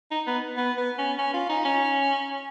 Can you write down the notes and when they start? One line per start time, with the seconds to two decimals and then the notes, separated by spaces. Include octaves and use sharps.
0.11 D#4
0.27 B3
0.58 B3
0.78 B3
0.98 C#4
1.18 C#4
1.34 F4
1.49 D#4
1.65 C#4